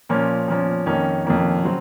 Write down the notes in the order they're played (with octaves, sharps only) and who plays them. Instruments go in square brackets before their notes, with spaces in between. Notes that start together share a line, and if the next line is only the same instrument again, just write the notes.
[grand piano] A#2 F3 A#3 C#4
A#2 F3 A#3 C#4
F2 D#3 A#3 C#4
F2 D#3 A#3 C#4
C#3 F#3 C4